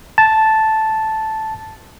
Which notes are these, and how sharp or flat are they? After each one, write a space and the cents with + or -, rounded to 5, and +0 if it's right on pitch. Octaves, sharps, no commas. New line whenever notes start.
A5 -5